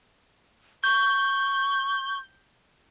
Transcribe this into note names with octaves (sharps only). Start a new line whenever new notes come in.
C#6 G6